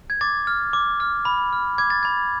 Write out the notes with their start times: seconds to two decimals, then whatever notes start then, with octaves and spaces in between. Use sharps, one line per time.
0.10 G#6
0.21 D6 A6
0.47 F6
0.73 D6
1.00 F6
1.25 B5
1.53 F6
1.78 D6 G#6
1.90 A6
2.03 B5 G#6